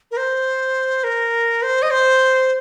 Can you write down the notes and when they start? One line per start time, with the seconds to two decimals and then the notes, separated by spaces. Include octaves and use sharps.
0.11 A#4
0.17 C5
1.04 A#4
1.62 C5
1.82 D#5
1.91 C5